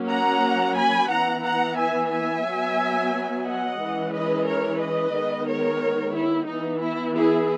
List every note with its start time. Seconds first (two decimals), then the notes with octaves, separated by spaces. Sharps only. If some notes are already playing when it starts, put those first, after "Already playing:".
Already playing: F#3 A#3 C#4
0.09 F#5 A#5
0.76 G#5 B5
1.10 E3 B3 F#5 A#5
1.44 F#5 A#5
1.78 E5 G#5
2.11 E5 G#5
2.45 F#3 B3
3.46 D#5 F#5
3.79 E3 G#3 C#4
4.13 B4 D#5
4.47 A#4 C#5
4.80 B4 D#5
5.14 D#3 G#3 B3
5.48 A#4 C#5
6.15 E4
6.48 E3 B3 D#4
6.82 E4
7.16 E4 G#4